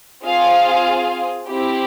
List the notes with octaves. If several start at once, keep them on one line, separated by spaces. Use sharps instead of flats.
C4 F4 G#4 F5
C4 E4 G4